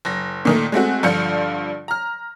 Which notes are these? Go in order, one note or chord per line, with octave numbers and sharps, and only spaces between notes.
F#1 A#6
A#2 D#3 A3
G#3 A3 C4 F#4
G2 D3 F3 F4 G6 C#7
A#5 F6